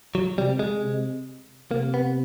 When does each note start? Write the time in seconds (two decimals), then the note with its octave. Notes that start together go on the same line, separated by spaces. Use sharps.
0.15 F#3
0.37 C3 G3
0.59 G#3
0.83 C3
1.71 C3 A#3
1.94 B3